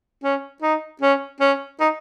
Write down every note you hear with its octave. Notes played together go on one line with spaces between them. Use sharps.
C#4
D#4
C#4
C#4
D#4